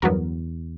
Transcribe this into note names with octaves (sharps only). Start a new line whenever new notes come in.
E2 G2 F#3 B3 F#4 A#4